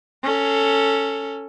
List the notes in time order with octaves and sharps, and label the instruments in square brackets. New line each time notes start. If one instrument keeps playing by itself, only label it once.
[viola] C#4 A4